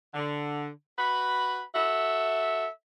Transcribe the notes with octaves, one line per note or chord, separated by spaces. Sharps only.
D3
F#4 B4 B5
F#4 A4 E5